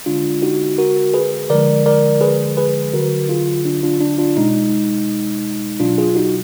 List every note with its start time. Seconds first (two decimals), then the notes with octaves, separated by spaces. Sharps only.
0.06 D3 G#3 D4 F4
0.42 D#4 F#4
0.78 F#4 A#4
1.14 G#4 B4
1.50 D3 F3 G#3 A#4 D5
1.86 A#4 D5
2.21 G#4 B4
2.57 G#4 B4
2.93 D3 F#3 F#4 A#4
3.29 F4 G#4
3.65 D4 F4
3.83 D4 F4
4.01 D4
4.18 D4 F4
4.37 B2 G#3 D#4
5.80 B2 F#3 D4 F4
5.98 F4 G#4
6.16 D#4 F#4